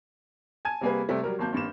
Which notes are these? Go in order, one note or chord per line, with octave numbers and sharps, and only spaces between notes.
G#5 A5 G#6 D#7
C3 G3 A#3 G#4 B4
C3 G3 A3
F#3 G3 A#4
G#1 F#3 A#3 A5 G6
G#1 G2 A#3 E7